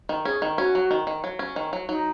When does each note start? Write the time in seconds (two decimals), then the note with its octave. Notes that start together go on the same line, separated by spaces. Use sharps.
0.09 D#3
0.25 C#4 G#4
0.42 D#3
0.58 C#4 F#4
0.75 F#3
0.91 D#3
1.07 D#3
1.24 F#3
1.39 C#4
1.56 D#3
1.73 F#3
1.89 F#3 D#4